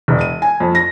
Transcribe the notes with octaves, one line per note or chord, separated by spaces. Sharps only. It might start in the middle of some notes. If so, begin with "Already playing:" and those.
E1
D#7
G#5
F2
A#6